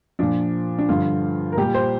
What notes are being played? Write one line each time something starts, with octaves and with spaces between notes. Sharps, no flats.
A#2 F3 D4
D4
G2 D3 F3 F4
A#4
A#2 G3 G4
C5